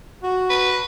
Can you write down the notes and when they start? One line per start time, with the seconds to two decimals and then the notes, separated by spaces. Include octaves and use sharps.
0.23 F#4
0.50 B4